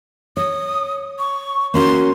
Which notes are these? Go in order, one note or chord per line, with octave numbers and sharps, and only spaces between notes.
C#5 D#6
C#6
A#3 C#4 F#4 C6